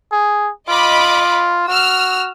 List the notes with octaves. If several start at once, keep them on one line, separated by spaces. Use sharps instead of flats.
G#4
F4 D#5 B5 D6
F#4 E6 F6